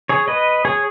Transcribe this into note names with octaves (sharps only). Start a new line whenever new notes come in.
G#4 C#5
B4 D#5
G#4 C#5